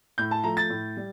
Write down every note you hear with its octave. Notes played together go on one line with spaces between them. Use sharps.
A2 G6
A5
F3 A3 A#5
A6
A2
G3